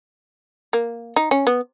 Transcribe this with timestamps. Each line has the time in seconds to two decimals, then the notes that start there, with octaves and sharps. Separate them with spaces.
0.73 A#3
1.16 D#4
1.31 C#4
1.47 B3